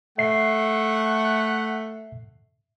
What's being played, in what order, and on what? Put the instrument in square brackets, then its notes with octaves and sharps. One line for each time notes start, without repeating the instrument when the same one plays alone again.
[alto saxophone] A3 [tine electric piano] E5 C7 [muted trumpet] F#5